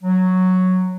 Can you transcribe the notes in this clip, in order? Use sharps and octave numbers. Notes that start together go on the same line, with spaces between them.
F#3